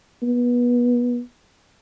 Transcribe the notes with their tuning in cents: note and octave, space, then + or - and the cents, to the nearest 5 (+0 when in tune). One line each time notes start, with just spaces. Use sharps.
B3 -25